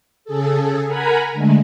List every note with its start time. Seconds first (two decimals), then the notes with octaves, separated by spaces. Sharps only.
0.25 C#3 G#4 A4
0.86 A#4 F#5 G#5 A#5 B5
1.32 D3 G#3 A3